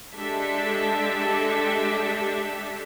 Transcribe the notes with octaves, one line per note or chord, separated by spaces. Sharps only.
G#3 D4 G4 A4 E5